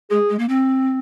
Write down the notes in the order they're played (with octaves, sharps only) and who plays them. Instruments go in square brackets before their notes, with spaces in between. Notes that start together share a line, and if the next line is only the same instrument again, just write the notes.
[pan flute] G#3 [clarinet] G#4
[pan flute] G#3
A#3
C4